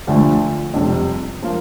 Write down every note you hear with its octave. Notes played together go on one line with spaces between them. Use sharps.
D2 D3 F3 A3
F2 C3 G3
F3 A#3 F4